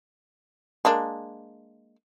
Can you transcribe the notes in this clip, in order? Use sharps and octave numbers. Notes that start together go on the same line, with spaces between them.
G#3 A#3 D4